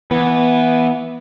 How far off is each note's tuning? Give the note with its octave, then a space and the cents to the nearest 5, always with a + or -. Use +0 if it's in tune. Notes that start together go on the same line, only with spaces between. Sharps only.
E3 +0 B3 -10